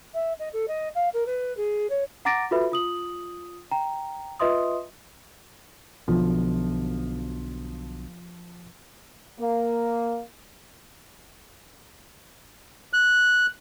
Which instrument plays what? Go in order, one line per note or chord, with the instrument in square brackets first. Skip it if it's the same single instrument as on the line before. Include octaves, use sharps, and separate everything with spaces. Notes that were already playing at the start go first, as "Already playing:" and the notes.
[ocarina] E5
D#5
A4
D#5
F5
A#4
B4
G#4
C#5
[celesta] F#5 A#5 D6 A6 A#6 D7
F4 F#4 A4 B4 E5 B5
F4 D#6 F#7
G5 A#5
F4 B4 D#5 E5 C6 D#6
[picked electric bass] B1 B2 D3 [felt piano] F3
[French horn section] A#3
[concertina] F#6